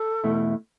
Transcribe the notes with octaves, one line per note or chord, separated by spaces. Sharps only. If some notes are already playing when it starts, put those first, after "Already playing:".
Already playing: A4
E2 B2 A3 E4